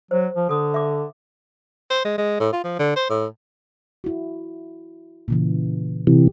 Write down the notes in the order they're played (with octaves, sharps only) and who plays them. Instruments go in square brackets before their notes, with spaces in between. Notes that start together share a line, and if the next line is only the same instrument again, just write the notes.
[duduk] F#3 [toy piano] C5
[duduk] F3
[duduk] D3 [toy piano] A4 D#6
[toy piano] E5 D6
[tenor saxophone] C5
G#3
G#3
A2
F4
F3
D3
C5
A2
[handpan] E4 F#4
A#2 C#3 E3
[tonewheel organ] C3 E3 [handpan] G4